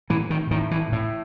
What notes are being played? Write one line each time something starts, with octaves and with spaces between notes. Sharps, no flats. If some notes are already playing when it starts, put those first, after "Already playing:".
A2 E3
D#3
A2 D#3
E3
A2